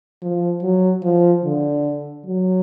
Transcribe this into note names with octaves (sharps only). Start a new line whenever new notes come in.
F3
F#3
F3
D3
F#3